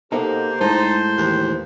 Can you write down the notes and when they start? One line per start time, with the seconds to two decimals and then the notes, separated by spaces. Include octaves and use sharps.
0.12 B2 A#3 D#4 G4 A4 C5
0.61 A2 G#3 D#4 C5 A5
1.18 D#2 E3